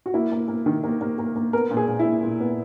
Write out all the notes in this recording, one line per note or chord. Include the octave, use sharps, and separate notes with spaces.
F#4
A#3 E4
A#3
A#3
D#3
A#3
A#3
A#3
A#3
B3 A#4
A#2
G#4
A#2
E4
A#2
A#2
B3